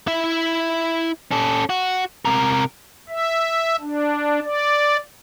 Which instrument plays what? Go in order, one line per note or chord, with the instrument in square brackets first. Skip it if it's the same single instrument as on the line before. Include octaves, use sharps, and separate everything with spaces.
[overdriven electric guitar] E4 E5
C#4 A4
F#4
C3 A#4
[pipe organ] E5
D4
D5